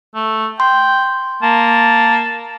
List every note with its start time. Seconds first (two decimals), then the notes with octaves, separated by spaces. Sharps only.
0.15 A3
0.60 G5 C6
1.42 A#3 A5